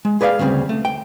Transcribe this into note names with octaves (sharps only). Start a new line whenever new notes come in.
G#3
G#4 B4 D5 E5 F5
D2 C#3 G3 C4
A3
G5